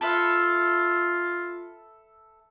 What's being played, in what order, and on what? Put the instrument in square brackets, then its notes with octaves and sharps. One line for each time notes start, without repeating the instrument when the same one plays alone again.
[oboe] F4 [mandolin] A4 B4 E5